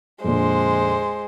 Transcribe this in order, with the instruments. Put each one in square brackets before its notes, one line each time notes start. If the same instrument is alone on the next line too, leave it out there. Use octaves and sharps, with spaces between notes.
[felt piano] F2 A#2 D3 [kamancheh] G#3 C5